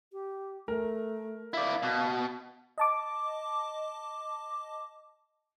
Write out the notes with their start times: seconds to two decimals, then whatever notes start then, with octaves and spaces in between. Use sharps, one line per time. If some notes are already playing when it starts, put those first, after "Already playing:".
0.13 G4
0.68 A3 A#4
1.54 E4 D5 F5
1.83 B2
2.78 D#5 A5 D6